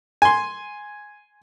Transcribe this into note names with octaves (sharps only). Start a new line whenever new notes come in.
G#5 C6